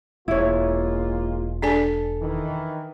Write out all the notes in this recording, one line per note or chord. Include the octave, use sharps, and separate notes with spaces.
E1 G#3 A#3 E4 F4 C#5
D4 A4 D5 G#5
D#3 E3